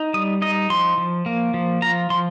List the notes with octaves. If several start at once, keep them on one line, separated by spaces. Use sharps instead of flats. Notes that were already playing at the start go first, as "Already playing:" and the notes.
Already playing: D#4
G3 D#6
D#4 D#5
F3 C6
F3
A#3
F3
F4 A#5
F3 C6